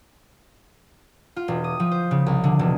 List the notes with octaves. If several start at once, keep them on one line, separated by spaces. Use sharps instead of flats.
F4
E1
D#6
F3
C5
C#3
C2
D3
E1